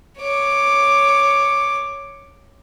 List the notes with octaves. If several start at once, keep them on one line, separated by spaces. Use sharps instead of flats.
C#5 D6